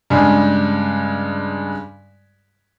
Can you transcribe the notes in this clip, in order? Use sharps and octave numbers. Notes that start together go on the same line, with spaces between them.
G2 C#3 G3 G#3